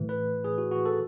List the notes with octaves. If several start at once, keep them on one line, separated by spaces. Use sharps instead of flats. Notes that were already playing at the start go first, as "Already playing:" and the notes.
Already playing: A2 E3
B4
G#4
F#4
F#4
A4